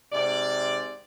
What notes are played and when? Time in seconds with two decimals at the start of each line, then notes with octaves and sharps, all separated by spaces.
0.12 G#2 C3 D5